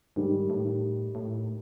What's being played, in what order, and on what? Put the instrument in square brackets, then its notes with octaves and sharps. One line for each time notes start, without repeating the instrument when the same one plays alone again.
[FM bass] G#2 [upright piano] D#3 G3
[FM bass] A2
A2